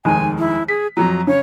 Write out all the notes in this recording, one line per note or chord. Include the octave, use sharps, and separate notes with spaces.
F1 D#2 G#3 G#5
E4
G#4 B6
F2 F3 F#3 A#5
C#3 C#5